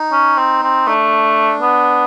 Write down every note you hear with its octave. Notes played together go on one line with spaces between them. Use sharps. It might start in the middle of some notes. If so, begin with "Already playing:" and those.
Already playing: D#4
C#4
C4
C4
A3 D4
B3